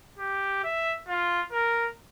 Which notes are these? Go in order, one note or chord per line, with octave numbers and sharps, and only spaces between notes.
G4
E5
F4
A#4